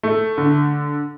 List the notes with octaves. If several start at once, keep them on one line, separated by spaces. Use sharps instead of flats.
A3
D3